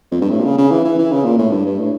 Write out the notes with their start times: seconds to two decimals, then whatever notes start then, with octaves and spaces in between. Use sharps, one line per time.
0.11 F2
0.21 G2
0.30 A2
0.40 A#2
0.45 C#3
0.58 C#3
0.71 E3
0.85 E3
0.98 E3
1.12 C#3
1.24 A#2
1.38 A2
1.51 G2
1.65 G2
1.79 A2